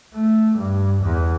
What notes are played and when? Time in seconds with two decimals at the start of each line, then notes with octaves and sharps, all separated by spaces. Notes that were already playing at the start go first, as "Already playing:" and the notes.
0.15 A3
0.59 G2
1.03 E2